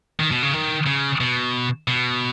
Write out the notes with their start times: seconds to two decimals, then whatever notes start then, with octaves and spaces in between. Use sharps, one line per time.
0.20 D#3
0.31 B2
0.43 C#3
0.53 D#3
0.87 C#3
1.20 B2
1.88 B2